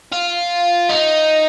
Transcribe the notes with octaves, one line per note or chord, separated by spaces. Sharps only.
F4
D#4